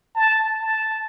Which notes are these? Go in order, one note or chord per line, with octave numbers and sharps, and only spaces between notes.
A5
A5